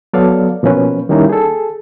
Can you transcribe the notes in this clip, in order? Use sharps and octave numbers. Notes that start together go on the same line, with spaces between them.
F#3 B3 A4 D5 F5
B2 F3 A#3 C#4 B4
D#3 G3 A#3 C#4 D#4 E4
G#4 A4